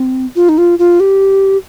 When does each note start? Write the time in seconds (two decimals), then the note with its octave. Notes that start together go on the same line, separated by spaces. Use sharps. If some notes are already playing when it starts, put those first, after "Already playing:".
Already playing: C4
0.36 F4
0.49 D#4
0.58 F4
0.79 F4
1.00 G4